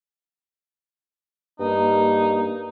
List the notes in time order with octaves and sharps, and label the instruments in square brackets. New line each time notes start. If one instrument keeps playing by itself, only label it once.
[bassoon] G2 [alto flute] A#3 [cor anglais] D#4